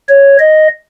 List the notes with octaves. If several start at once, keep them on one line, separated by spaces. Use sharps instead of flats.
C#5
D#5